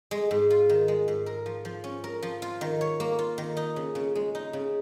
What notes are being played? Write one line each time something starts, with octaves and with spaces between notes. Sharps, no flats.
G#3
G#2
F4
D#3
G#3
G#2
A#4
F3
F3
C#4
A#4
F3
F4
D#3
C#5
A#3
F4
D#3
D#4
C#3
C#3
G#3
D#4
C#3